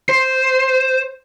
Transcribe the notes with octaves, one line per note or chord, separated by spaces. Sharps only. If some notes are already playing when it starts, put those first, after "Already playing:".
C5